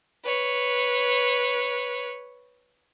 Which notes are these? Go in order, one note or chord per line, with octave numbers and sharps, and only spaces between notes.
B4 C#5